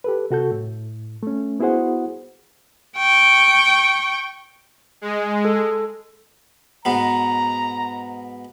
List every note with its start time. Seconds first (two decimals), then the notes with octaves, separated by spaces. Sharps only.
0.04 G4 A4 B4
0.30 C3 F#4 A4 G6
0.51 A2
1.23 A3 C#4
1.60 B3 E4 F#4 G#4 C5 F#5
2.97 G5 C#6
5.01 G#3
5.45 A4
6.85 G#2 B2 B3 A#5